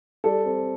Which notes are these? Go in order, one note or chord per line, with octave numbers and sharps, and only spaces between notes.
G3 A4 D5
C4